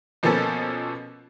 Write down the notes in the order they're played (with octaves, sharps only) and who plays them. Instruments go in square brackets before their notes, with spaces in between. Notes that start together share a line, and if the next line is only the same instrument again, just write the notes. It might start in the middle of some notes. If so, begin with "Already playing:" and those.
[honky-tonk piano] B2 F3 A#3 B3 C#4 A4